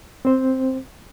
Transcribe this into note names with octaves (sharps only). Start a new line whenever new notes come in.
C4 C5